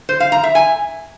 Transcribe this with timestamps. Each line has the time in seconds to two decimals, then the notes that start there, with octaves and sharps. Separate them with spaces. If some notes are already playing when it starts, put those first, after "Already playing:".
0.09 C5
0.20 F5
0.32 A#5
0.43 E5
0.55 G#5